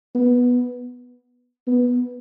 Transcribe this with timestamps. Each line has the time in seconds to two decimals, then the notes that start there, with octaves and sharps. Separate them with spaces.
0.15 B3
1.67 B3